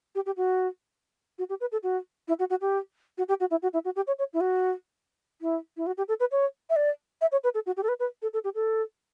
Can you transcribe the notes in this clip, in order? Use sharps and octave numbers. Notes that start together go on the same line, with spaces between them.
G4
G4
F#4
F#4
G4
B4
A4
F#4
E4
F#4
F#4
G4
F#4
G4
F#4
E4
F#4
E4
F#4
G4
C#5
C#5
E4
F#4
E4
E4
F#4
G4
A4
B4
C#5
E5
D5
E5
C#5
B4
A4
F#4
G4
A4
B4
B4
A4
A4
G4
A4